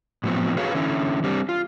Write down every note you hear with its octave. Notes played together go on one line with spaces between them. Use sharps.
A2 F3 F#3 B3 C4
F#4 G#4 B4 C#5 F5
D3 E3 C#4 E4
G3 C4 D4
F4